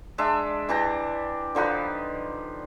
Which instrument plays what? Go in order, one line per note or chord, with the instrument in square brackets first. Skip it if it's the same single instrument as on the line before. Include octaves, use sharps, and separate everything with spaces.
[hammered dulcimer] G#3 D4 E5
E3 D4 G4 A#5
D3 F3 D#4 B4